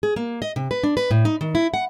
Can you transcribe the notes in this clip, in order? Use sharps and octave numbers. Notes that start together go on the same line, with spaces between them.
G#4
A#3
D#5
C3
B4
D4
B4
A2
D#4
D#3
E4
F#5